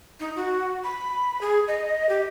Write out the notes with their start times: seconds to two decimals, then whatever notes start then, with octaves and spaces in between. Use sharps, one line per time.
0.20 D#4
0.36 F#4
0.84 B5
1.41 G#4
1.68 D#5
2.09 G4